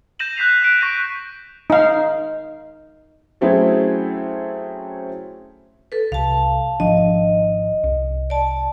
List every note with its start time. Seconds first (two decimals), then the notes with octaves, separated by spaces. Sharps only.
0.19 G6 A#6 D#7 E7 F#7
0.37 F#6 G6 B6 C7 F7
0.62 F#6 D7
0.81 C#6 A#6 B6 D7 D#7
1.70 D#4 F5
3.41 F#3 A3 C4 C#4 E4 G#4
5.92 A4 B4
6.12 C2 F5 A5
6.80 G#1 F3 D4 D#5
7.84 C2
8.30 D5 A5